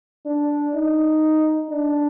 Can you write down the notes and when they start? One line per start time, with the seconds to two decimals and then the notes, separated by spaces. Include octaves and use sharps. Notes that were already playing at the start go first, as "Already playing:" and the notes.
0.26 D4
0.74 D#4
1.70 D4